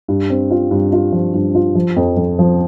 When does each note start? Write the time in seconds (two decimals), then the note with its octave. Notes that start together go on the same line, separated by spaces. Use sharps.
0.08 G2
0.30 C4
0.51 F4
0.71 G2
0.93 F4
1.12 F3
1.34 G2
1.55 F4
1.75 F3
1.96 F2
2.17 F2
2.39 F3